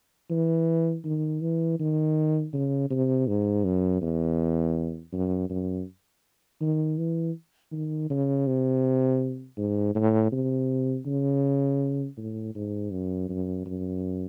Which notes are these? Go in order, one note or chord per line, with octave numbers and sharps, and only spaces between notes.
E3
D#3
E3
D#3
C#3
C3
G#2
F#2
E2
F#2
F#2
D#3
E3
D#3
C#3
C3
G#2
A2
C3
C#3
A2
G#2
F#2
F#2
F#2